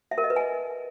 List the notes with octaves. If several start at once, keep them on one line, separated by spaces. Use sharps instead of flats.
E5
A#4
D#5
B4
G#5